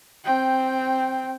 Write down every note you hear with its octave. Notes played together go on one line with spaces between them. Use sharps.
C4 G5